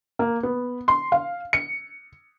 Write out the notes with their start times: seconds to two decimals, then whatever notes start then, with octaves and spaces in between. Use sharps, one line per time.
0.19 A#3
0.43 B3
0.88 C6
1.12 F5
1.53 C#7